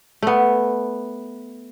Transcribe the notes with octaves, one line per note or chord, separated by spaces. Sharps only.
A3 B3